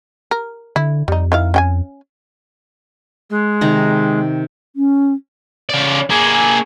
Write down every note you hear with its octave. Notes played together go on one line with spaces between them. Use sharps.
A#4
D3 E4
F2 G3 D#4
D#3 E4 F5
C#4 G5 G#5
G#3
C3 D#3 A#5
C#4
C#3 D5
A#3 G#4